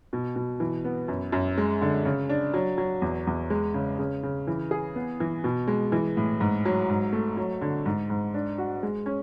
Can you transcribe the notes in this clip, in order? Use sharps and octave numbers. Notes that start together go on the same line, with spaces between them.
B2
B2
E3
B3
F#2
F#2
G#3
D3
C#3
D4
F#3
F#3
E2
E2
G#3
C#3
C#3
C#3
E3
G#4
B3
E3
B2
G#3
E3
A2
G#2
F#3
G#2
A3
F#3
D3
G#2
G#2
D4
F#4
G#3
C#4